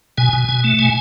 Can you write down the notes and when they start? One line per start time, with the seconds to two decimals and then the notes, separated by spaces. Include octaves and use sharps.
0.18 B2 G#5
0.33 B2
0.49 B2
0.64 A3
0.79 B2 G#5